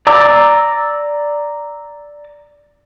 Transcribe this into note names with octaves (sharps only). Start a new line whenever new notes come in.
D5 A#5 D6 E6